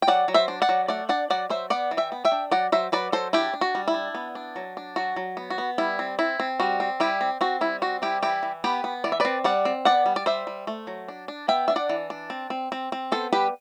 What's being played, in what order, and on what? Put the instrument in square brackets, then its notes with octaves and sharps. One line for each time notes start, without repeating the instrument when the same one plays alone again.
[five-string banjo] G5
F#3 D5 F#5
F#3
C5 E5
D4
D5 F#5
F#3
A3 D5 F#5
D4 D5 F#5
F#3 D5 F#5
F#3 C5 E5
B3 D5 F#5
E3
E5 G5
B3
E5 G5
D4
F#3 D5 F#5
F#3 C5 E5
F#3 B4 D5
F#3 A4 C5
D4 E4 G4
D4
F#4
G3
E4
D4
B3
D4
F#3
D4
F#3 F#4
F#3
B3
F#4
B3
G3 E4
C4
C4 E4
C4
G3 F#4
C4
G3 E4 G4
C4
C4 F#4
G3 E4
C4 F#4
G3 E4 G4
E3 E4 G4
E3
B3 G4 B4
B3
E3 D5
E5
C4 B4 D5
G3 D5 F#5
C4
B3 D5 F#5
G3
D5
G3 C5 E5
G3
A3
F#3
D4
D4
B3 E5 G5
D4 E5
D5 F#5
E3
D4
C4
C4
C4
C4
B3 A4 C5
G3 G4 B4